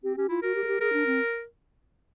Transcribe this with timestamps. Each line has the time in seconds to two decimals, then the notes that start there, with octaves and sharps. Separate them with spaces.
0.03 C4 G4
0.17 C#4 G4
0.29 E4 F4
0.42 F#4 A#4
0.55 G4
0.64 G#4
0.68 G4
0.80 G#4 A#4
0.93 D4
1.06 C4